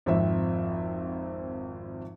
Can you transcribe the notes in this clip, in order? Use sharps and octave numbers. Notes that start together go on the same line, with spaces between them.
G#1 F2 C4 E5